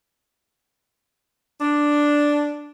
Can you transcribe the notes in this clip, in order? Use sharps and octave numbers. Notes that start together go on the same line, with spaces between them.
D4